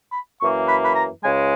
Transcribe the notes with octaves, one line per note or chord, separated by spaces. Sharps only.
B5
F#2 E3 A#3 C#6
B5
B5
A#5
C#2 C#3 G#3 G#5